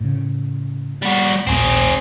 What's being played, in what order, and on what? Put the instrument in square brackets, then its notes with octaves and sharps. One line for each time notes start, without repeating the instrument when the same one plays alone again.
[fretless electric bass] A2 C#3
[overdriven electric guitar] G3 F#4
[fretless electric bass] A#1 D#2 A3 [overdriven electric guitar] C4 G#4